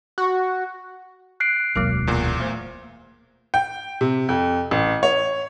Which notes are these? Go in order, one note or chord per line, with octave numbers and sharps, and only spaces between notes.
F#4
F#6 C7 D7
E1 D2 F#3 A#3 A#4
E2 A#2
A3 C5
G5
C3
F2
A1
C#5